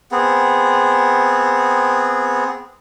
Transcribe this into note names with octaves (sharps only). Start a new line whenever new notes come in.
B3 C4 G#4